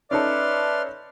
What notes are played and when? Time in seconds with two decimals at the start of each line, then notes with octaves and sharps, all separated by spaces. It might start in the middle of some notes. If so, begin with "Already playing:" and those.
0.11 C#4 D#4 A4 B4 D5 E5 C6 F6